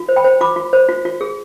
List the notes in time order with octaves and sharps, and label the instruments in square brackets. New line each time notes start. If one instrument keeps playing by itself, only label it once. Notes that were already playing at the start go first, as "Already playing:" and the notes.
Already playing: [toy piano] F4
C5
G5 B5
C5
F4 B5 D6
F4
C5
F4
F4
G#4